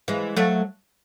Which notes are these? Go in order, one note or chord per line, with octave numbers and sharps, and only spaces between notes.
E3 G#3
F#3 A3